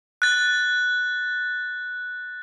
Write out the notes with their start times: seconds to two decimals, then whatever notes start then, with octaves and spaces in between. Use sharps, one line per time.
0.22 F#6 A6